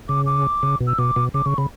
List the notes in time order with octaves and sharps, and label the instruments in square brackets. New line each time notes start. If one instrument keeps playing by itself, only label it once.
[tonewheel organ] C#3 [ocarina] D6
[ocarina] D6
[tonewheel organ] C#3
B2
[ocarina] E6
[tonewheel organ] B2 [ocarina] D6
[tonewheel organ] B2
[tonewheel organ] C#3 [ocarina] D6
[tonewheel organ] C#3 [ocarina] C#6
[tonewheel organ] C#3 [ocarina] B5